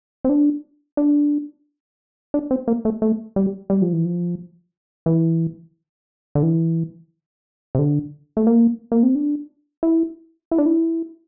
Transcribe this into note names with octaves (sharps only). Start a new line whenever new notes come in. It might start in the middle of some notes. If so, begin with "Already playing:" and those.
C4
D4
D4
D4
C4
A#3
A3
A3
G3
G3
F3
E3
F3
E3
D3
E3
C3
D3
A3
A#3
A#3
C4
D4
E4
E4
D4
E4